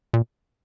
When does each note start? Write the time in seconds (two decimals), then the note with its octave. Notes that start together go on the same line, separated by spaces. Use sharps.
0.14 A#2